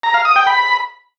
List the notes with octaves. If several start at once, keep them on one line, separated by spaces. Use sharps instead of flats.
A#5
F5
D#6
G5
B5